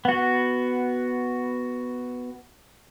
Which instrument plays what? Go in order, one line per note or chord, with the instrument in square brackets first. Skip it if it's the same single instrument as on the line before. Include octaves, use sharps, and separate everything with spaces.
[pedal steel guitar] B3 F#4